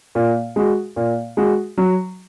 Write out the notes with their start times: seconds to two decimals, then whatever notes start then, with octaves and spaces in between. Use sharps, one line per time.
0.15 A#2
0.56 G#3 F#4
0.96 A#2
1.37 G#3 F#4
1.77 F#3